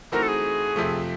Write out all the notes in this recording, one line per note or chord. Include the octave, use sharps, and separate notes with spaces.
E3 A3 C4 D#4 F#4 A#4
A4
G#4
F2 C3 F3 A3